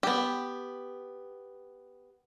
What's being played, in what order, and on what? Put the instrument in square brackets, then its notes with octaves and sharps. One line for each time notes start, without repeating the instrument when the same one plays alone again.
[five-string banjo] B3 G4